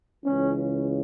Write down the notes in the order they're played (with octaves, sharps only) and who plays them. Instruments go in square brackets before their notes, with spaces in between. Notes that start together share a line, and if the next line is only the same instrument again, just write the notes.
[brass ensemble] C#2 C#3 E3 C#4